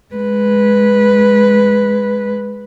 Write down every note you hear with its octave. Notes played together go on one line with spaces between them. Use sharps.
G#3 B4